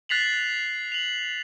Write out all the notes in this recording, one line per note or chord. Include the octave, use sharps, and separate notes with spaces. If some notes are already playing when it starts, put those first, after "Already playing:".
F#6 A6 B6 C7 F7 F#7
F7 F#7